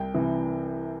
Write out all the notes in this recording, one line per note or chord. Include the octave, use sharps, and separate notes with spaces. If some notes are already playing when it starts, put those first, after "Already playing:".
Already playing: C2 G5
C3 E3